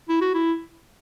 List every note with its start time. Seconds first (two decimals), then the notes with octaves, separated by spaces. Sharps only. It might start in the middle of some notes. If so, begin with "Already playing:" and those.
0.09 E4
0.21 F#4
0.34 E4